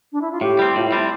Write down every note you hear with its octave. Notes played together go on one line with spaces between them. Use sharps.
D4
E4
F4
A2 G4
G3 C4
A2 F4
E4
G3 C4
E4